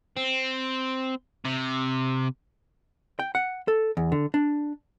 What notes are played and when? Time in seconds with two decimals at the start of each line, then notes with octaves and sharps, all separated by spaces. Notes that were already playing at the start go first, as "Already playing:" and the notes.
0.17 C4
1.45 C3
3.19 G5
3.35 F#5
3.68 A4
3.97 E2
4.12 D3
4.34 D4